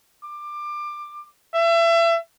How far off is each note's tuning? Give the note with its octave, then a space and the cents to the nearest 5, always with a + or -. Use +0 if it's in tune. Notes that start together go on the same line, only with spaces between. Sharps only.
D6 +20
E5 +30